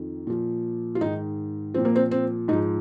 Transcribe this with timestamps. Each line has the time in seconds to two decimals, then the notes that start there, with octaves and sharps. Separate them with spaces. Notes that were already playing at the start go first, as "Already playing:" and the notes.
Already playing: F2 D#3
0.27 A#2 F3
0.95 F4
1.01 G#2 D#3 D#4
1.74 A#2 F3 C4
1.85 A#3
1.96 C4
2.11 C4
2.48 G#2 D#4
2.53 F3